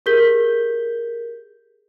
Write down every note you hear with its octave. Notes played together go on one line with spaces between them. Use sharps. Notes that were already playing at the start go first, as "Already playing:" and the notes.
G4 G#4 A#4 G6 B6 G7